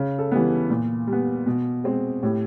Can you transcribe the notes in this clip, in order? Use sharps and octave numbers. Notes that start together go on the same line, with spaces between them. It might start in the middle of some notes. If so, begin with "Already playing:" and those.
Already playing: C#3
A4
E3 G3 B3
A#2
G3
B3
B2
G#3 C4
A2 G4